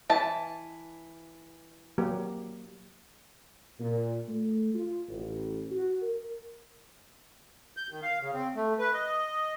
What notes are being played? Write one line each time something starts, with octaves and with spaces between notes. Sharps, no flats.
E3 A5
F#3 A#3 G4
A#2
A3
F4
A1
F#4
A#4
G6
D#3
F5
C#3
C4
A3
B4
D#5